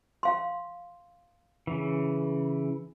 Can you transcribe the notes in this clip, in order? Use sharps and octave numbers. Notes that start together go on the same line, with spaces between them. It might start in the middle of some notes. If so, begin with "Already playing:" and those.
F5 C6
C#3 E3